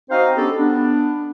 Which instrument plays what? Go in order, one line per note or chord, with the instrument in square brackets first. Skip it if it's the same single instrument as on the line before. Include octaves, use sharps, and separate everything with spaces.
[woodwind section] C4 D#4 F#4 C5 D#5 F5
B3 C#4 D4 G4 A4
B3 D4